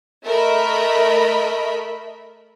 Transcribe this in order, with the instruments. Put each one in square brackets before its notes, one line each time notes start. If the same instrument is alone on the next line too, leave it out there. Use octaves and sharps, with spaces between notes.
[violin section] A3 A#4 D#5 E5 B5